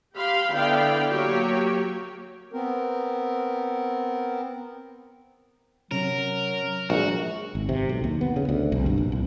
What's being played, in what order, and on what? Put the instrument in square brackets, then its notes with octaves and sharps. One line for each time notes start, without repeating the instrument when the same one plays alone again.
[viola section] G4 F5 B5 C6
D3 B3 E4 D5 F5 G5
F#3 A#3 G4 C#5
[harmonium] B3 C4 A#4
[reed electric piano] C3 C#4 [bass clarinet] F#3 [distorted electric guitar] A#4
[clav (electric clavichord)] A#1 [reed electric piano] F#3 G#3 G#4 [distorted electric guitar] F#4
[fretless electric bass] G#1
C3
B1
D#2
B3
C#3
D2
C2
G2
A#1
C2